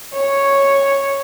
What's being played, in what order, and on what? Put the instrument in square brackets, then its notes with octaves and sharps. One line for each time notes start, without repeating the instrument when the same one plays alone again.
[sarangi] C#5